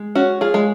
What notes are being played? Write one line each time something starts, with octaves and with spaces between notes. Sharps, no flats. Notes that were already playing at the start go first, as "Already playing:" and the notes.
Already playing: G#3
C#4 F#4
F4 G#4
G#3